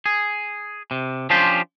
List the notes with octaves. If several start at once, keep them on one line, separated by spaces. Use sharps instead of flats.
G#4
C3
F3 C#4 D4 F4 G4 C5